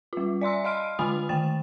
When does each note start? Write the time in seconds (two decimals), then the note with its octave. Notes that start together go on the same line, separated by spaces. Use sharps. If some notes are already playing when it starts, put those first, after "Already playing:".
0.13 G3 F4
0.41 D5 E5 C6 E6
0.64 D#5 F5 C6 F6 D7 D#7
0.99 D3 G#3 F4 G#5 B5 D#6
1.29 D#3 G5 A6